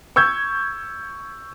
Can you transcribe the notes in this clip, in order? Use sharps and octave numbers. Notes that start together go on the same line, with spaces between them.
C#6 E6 G6 G#6